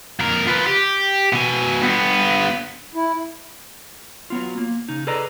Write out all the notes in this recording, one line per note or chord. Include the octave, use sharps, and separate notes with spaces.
F2 A#4
F4 B4
G4
B2 G#5
G2 B3
E4
F#3 B3 F4
A#3
C#3 D#4
G#4 A4 B4 D5 D#5 A#5